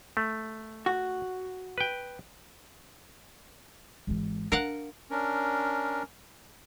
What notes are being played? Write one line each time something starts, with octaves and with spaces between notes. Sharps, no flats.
A3
F#4
B4 G5
G#1 E3
D4 A#4 F5 F#5
C#4 D4 A#4